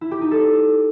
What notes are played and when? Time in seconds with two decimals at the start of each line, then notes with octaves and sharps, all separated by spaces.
0.01 E4
0.11 G4
0.21 D#4
0.31 A4